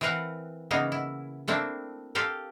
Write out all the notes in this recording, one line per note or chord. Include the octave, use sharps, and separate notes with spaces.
E3 C4 A#4 B4 F5 F#5
C#3 E3 A#3 B3 D#4
E4
A3 A#3 C4 D4 E4
F4 G4 A4 A#4 F5 G5